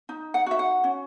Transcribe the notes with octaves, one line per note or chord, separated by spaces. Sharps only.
D#4
F#5
F#4 E5
F#5
C#4